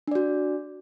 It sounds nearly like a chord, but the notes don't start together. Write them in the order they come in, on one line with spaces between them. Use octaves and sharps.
D4 D5 F#4